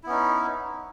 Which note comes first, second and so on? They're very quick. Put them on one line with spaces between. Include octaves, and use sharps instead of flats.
E4 B3 C#4 D#4